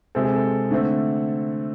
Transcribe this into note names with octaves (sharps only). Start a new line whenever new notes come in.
C3 G#3 C4 A4
G#4
A4
D3 A3 C4